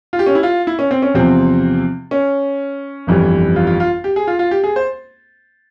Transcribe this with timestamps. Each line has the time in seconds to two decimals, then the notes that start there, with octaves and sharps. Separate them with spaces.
0.13 F4
0.19 G4
0.26 C#4
0.35 E4
0.43 F4
0.67 E4
0.79 C#4
0.91 C4
1.02 C#4
1.14 E2 C3 F3 C4
2.11 C#4
3.07 G1 F2 E3 G3
3.56 F4
3.67 F4
3.80 F4
4.04 G4
4.16 G#4
4.27 F4
4.39 F4
4.51 G4
4.64 G#4
4.76 C5